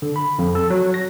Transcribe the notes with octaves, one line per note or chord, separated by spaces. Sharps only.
D3
B5
F2
A4
F#3
A#6